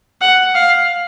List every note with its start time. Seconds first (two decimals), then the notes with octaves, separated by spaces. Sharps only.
0.21 F#5
0.55 F5